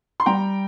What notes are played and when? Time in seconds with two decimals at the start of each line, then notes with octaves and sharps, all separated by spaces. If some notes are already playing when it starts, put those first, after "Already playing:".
0.20 C6
0.26 G3 G5 A#5